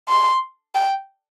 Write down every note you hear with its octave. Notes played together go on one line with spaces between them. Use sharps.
C6
G5